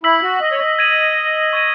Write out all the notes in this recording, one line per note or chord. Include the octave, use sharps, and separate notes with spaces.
E4 E6 B6 F#7
F#4
D#5
C#5
D#5
G#6 D#7 F#7
C#6 G#6 D#7